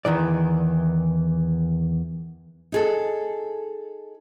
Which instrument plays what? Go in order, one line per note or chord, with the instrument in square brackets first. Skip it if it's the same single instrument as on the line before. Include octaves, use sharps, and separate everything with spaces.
[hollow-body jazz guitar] E2 D#3 E3 D5
[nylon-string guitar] D#4 G#4 A4